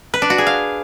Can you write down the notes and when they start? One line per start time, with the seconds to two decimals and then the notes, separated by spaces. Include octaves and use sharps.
0.14 B4
0.22 D4
0.30 F#4
0.38 G#4
0.47 F5